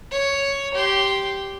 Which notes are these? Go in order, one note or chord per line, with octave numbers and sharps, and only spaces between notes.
C#5
G4 C6